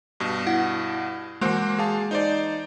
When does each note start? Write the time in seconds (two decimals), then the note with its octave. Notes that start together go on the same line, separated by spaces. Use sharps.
0.20 G2 B2
0.47 E4 F#5
1.41 E3 G#3 A#3 F#4 C5
1.78 G#4 F5 A5
2.11 D#4 C5 D5